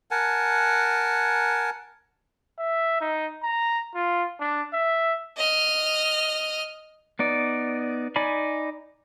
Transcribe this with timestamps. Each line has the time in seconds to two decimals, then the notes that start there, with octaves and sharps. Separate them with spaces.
0.11 A#4 F#5 G#5 A5
2.59 E5
3.01 D#4
3.43 A#5
3.95 F4
4.40 D4
4.73 E5
5.37 D#5 F6
7.19 B3 D#4 D5
8.16 D#4 D5 G#5 B5